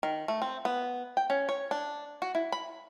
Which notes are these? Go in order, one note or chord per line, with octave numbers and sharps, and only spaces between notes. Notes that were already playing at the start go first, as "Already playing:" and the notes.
D#3
A3
C4
B3
G5
C#4
C#5
D4
F#4
E4
B5